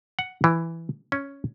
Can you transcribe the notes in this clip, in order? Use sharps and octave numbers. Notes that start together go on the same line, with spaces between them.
F#5
E3
C#4